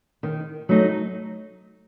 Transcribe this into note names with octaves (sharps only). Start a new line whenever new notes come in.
D#3
F#3 A3 D#4